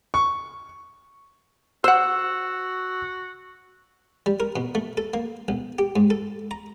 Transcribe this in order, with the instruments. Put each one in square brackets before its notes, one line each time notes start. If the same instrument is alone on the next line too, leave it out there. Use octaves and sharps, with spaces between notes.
[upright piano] C#6
[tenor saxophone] F#4 [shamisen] C5 F#5 [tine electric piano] E6
[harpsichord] G3
A#4
B2
A3
A4
A#3
B1
G4
G#2
A4
A#5